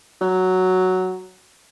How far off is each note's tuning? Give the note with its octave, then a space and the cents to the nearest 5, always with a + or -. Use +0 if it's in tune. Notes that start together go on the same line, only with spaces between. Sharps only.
F#3 +5